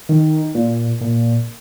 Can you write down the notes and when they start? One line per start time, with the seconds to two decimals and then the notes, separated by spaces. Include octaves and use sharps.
0.09 D#3
0.55 A#2
1.01 A#2